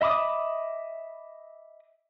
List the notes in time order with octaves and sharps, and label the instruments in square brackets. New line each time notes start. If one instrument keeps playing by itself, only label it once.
[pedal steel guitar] D#5 E5 B5 D6 D#6